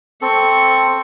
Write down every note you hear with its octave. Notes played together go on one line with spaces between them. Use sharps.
C4 A4 C#6